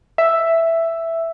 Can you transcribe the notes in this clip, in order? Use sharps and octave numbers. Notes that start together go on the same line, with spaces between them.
E5